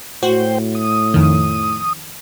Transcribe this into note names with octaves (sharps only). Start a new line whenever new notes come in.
A2 F#4 C5 G5
D#6
F2 D#3